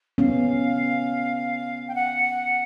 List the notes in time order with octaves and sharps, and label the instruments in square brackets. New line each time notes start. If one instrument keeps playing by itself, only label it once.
[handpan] B3 C#4 [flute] F5
[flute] G5
F#5